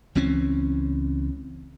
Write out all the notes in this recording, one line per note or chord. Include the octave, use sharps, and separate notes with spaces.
C#2 E3 C4 C#4